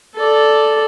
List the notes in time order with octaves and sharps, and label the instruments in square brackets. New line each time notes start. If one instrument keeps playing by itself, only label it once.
[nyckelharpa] A4 D5